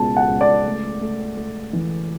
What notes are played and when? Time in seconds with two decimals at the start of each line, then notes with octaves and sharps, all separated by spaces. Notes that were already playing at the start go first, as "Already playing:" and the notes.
Already playing: C#2 B2 A5
0.17 F#5
0.29 C#2
0.41 D5
0.65 A3
1.01 A3
1.37 A3
1.73 E3